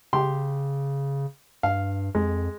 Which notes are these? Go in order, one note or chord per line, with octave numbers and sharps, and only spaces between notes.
C#3 G4 C6
G2 F5
F2 G#3